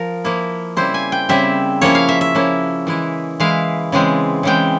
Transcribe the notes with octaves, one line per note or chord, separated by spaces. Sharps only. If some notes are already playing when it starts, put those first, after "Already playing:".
Already playing: F3 A#4
F3 A#3 E4
C#3 G3 C4 E4 C5
G#5
G5
C#3 G3 C4 E4 E5
F3 A#3 C#4 E4 C#5
F5
E5
E5
F3 A#3 C#4 E4
E3 G#3 E4
E3 G#3 E4 F5
C#3 E3 G#3 C4
C#3 E3 G#3 C4 G5